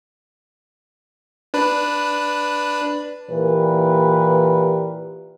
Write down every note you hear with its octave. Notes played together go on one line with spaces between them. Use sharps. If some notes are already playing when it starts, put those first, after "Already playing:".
D4 B4
A#2 E3 G4 A#4 B4